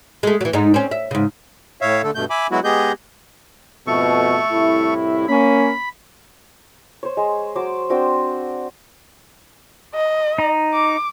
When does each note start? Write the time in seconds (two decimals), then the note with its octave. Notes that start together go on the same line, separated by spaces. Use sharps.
0.23 G#3 A3
0.41 E3 F#3
0.53 G#2 D#4
0.74 C4 C#4
0.91 E5
1.11 G#2 C#3
1.81 A2 C#5 E5 F5
2.03 D3 A3 A4
2.15 G2 B2 A3 G6
2.30 E5 G#5 B5 D6
2.51 F#3 G#3 B3 E4 F#4
2.64 G#3 B3 G4 G#4 D#5 G6
3.87 F2 G#2 B2 A3 A4 C#6
4.51 C2 A2 E4
5.28 A#3 C#4 B5
7.03 C5 C#5
7.17 G#3
7.56 F#3 C5 D6
7.90 C4 D4 F#4 G5
9.94 D#5
10.38 D#4 A#5
10.74 D6